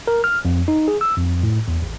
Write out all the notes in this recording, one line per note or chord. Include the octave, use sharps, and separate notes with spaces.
A#4
F6
F2
D#4
G#4
E6
F2
A2
E2
A1